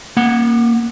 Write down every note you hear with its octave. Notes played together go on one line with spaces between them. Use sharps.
A#3 F#5